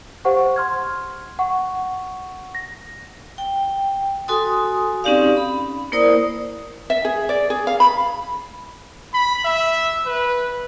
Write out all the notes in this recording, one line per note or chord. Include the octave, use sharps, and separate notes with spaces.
G4 C5 F5 F#5 C#6
C6 F6 G#6
F#5 C#6
A#6
G5
F#4 A4 G#5 C6 D#6
C4 C#4 D#4 G4 D5 F5
B5
A#3 E4 A#4 C5 D5 D#6
E5
G#4
D5
G#4
F5
B5
B5
E5
B4